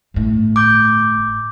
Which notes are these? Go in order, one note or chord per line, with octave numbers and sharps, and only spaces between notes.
G1 A2
D6 G6